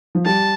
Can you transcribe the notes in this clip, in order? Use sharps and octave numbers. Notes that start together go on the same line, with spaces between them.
F3
G3 A5